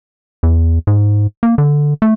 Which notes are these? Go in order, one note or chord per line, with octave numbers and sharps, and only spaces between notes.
E2
G#2
A#3
D3
A3